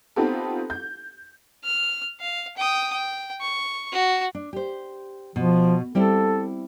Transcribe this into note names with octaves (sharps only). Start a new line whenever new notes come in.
B3 C4 D#4 F4 G4 A4
G6
F6
F5
G5 D#6
G5
C#6
F#4
D4
G4 C5
B2 F3
G3 C4 E4 A4